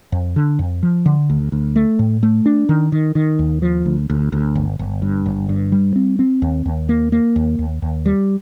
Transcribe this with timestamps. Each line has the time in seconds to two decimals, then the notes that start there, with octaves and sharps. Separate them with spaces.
0.12 F2
0.36 D3
0.59 F2
0.83 F3
1.06 D3
1.30 D2
1.52 D2
1.76 A3
1.99 A2
2.23 A3
2.46 D4
2.69 D#3
2.92 D#3
3.15 D#3
3.39 D#2
3.62 F3
3.86 D2
4.10 D2
4.32 D2
4.55 G1
4.79 G1
5.02 G2
5.26 G1
5.49 G2
5.72 G3
5.96 C4
6.19 C4
6.42 D#2
6.66 D#2
6.89 A#3
7.12 A#3
7.36 D#2
7.59 D#2
7.82 D#2
8.06 G3